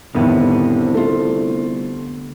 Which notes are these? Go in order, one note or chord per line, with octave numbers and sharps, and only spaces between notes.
C2 F2 A2 D3 D#3 B3 B4
A3 F4